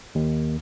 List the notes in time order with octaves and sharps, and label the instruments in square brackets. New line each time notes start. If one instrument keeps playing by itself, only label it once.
[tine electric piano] D#2